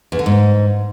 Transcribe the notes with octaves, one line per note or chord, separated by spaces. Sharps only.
E2
D3
G#2